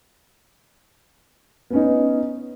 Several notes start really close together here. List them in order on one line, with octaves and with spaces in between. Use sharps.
B3 C#4 D#4